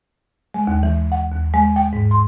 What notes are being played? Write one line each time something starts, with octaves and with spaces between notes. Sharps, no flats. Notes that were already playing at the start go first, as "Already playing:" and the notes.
G#3
D#2
E3
F#5
D#2
G#3
G5
G#2
C6